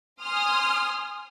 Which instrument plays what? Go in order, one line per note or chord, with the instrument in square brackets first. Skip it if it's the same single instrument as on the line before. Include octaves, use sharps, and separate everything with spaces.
[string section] G#5 C6 D#6 F6